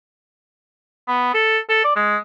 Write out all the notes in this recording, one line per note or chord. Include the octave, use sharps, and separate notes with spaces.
B3
A4
A4
D5
G#3